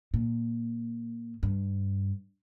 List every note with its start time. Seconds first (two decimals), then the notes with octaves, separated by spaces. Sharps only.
0.14 A#2
1.43 G2